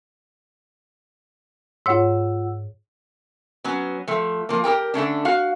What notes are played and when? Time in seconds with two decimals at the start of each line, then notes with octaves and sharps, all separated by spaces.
1.86 G#2 F4 C#5 F#5 E6
3.64 F#3 B3 C#4
4.08 F3 A3
4.49 F3 A#3
4.64 G4 G#4 A#4 G5
4.94 D3 A3 C#4 D4
5.25 F#4 F5